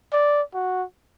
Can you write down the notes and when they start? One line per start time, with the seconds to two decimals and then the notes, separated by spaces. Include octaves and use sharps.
0.12 D5
0.54 F#4